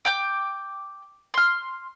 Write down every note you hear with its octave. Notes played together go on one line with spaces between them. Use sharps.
G5 D6 G6
C6 F6